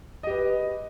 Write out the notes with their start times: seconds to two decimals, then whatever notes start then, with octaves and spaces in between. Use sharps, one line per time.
0.23 D#5
0.27 G4
0.30 B4